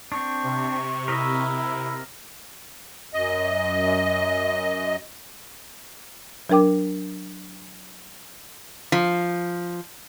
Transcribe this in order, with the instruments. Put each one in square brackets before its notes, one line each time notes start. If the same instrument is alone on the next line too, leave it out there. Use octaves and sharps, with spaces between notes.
[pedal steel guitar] C4 D4 [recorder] C#6
[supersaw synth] C3
[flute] E4 [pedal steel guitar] A#4 D#5 E5
[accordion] F#2 D#5
[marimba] F#3 D4 A#4 G5 D6
[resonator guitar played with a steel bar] F3